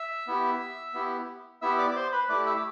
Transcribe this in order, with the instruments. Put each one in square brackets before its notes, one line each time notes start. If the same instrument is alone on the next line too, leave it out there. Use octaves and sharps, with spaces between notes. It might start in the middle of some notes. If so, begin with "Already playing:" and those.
Already playing: [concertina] E5 E6
B3 E4 G4
B3 E4 G4
B3 E4 G4 E5 E6
D5 D6
D6
C5 C6
B4 B5
A3 E4 G4 D5 D6
E5 E6
D6